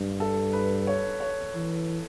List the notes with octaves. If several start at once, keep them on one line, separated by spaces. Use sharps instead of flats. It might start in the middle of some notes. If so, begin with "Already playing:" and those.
Already playing: G2
A4
B4
C#5
C#5
E3